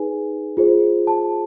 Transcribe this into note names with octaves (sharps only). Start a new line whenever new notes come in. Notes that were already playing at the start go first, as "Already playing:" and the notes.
Already playing: D#4 G#4 B4 G#5
F4 G#4 C5
A5